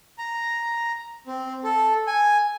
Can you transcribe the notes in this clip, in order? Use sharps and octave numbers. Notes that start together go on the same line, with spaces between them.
A#5
C4
A4
G#5